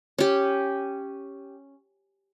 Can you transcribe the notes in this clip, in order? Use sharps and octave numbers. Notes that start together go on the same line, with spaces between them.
C#4 G4